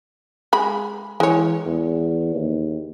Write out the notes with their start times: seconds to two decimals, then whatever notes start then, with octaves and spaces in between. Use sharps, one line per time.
0.53 G#3 B5
1.20 E3 G#3 C#5
1.66 E2
2.35 D#2